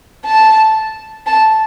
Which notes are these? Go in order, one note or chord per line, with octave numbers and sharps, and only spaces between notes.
A5
A5